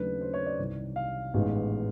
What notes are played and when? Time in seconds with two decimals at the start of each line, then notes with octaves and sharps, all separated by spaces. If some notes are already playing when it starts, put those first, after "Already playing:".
Already playing: D#2 C#3 F#3 A3 D4 B4
0.21 C5
0.34 C#5
0.46 D5
0.59 C2 C3 D#3
0.96 F5
1.34 A1 G#2 D#3 G#3 B3